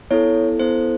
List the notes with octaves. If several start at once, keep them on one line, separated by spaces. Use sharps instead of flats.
B3 E4 A4 C#5
B3 E4 A4 C5